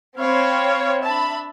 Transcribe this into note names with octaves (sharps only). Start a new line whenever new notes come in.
C4 C#5 F5 B5
D4 E5 A5 B5